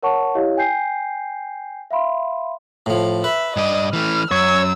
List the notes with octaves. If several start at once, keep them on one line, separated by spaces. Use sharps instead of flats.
A#4 C#5 F#5 A5 C#6
E4 G4 C#5 D#5 F5
G5 G#5 G6 C7
E5 F5 B5 C6
A2 F3
B4 E5
G2 D5 D#5
E3 A3 F6
F#2 C#5 E6